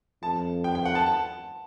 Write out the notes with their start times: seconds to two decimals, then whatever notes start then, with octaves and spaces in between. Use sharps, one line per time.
0.23 F2 A5
0.64 G5
0.75 G5
0.85 F#5
0.95 A5
1.06 A5